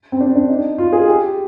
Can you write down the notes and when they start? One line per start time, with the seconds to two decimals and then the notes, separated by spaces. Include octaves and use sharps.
0.12 C4
0.21 D4
0.35 D4
0.50 D#4
0.78 F4
0.93 G#4
1.07 G4